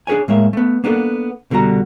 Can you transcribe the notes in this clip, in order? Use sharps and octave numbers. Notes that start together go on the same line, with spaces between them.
D4 G#4 B4 C#5 G#5
A2 G#3 A#3 E5
A3 B3
A#3 B3 D4 F#4 A4 F#5
C2 B2 D3 G3 F#4 A#5